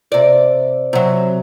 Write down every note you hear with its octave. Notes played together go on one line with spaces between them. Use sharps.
C3 D5
C3 F#3